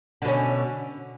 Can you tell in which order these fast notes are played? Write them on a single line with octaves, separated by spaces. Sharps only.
D3 B2 C#4